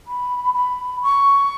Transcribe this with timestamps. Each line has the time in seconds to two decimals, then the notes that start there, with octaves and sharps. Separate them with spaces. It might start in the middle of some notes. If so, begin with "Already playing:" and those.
0.07 B5
0.55 B5
1.02 C#6